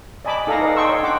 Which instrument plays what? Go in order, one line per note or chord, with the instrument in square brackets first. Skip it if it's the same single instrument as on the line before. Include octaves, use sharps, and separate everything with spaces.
[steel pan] D5 D#5 G#5 A5 B5 D6
D#4 A4 F5 G#5 A#5
B4 D5 D#5 F5
D#5 G5 A5 C6 C#6 E6
C#5
D4 F#5 G5 C6 D6